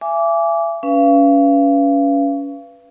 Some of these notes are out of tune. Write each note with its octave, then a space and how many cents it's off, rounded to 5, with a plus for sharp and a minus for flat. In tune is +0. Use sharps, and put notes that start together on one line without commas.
E5 +35 G#5 +0 D6 -20
C#4 +25 B4 +0 F5 -30